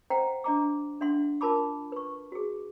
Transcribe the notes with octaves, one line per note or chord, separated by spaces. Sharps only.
C5 D#5 F#5 G5 A#5
D4 D#5 A#5 D6
D4 E5 F#5 C6
F4 A#4 A5 B5 D6
B4 C#6
F#4 G#4